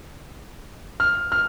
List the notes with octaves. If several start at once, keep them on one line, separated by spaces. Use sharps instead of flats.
F6
F6